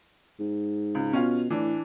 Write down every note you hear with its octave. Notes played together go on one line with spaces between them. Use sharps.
G#2
C#2
B2 C#4 F4
A2 E3 D4